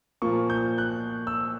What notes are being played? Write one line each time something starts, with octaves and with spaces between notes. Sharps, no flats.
A#2 F3 A#3 C#6
G6
F#6
E6